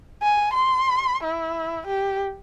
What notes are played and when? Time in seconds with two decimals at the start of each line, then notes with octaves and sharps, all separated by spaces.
0.23 G#5
0.54 C6
1.24 E4
1.87 G4